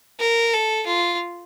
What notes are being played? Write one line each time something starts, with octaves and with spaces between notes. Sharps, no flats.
A#4
A4
F4